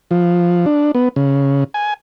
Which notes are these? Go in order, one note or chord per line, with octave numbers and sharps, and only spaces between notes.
F3
D4
B3
C#3
G#5